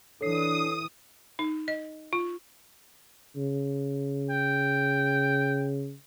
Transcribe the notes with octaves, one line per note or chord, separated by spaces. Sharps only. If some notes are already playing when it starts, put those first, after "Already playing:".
E3 D4 A4 C#5 D#6 C7
D#4
D#5
F4
C#3
G5